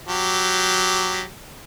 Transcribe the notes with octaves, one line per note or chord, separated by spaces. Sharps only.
F#3 G4